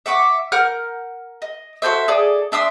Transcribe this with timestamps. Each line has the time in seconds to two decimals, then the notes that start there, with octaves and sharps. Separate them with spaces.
0.06 E5 F#5 C#6 D6
0.52 A#4 F#5 F6 G6
1.42 D#5
1.82 F#4 A4 C5 E5
2.08 G#4 A4 D5
2.52 D4 E5 C6 D#6